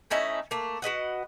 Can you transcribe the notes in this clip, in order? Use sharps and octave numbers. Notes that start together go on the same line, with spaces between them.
A3 C#4 D#4 E4
A3 A#3
F#4 B4 D#5 F#5